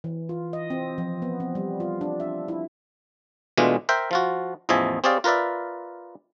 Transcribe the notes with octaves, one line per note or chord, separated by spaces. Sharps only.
E3
F4
D#5
C4
F3
B3
C4
G3
F4
D4
E5
E4
B2 E3 G#3 A3 D4 F4
A#4 C5 E5 G5
F3 F4 F#4
A1 E2 F3 D#5 E5 G#5
C4 G4 G#4 C#5 D5 F5
F4 A#4 B4 D5 E5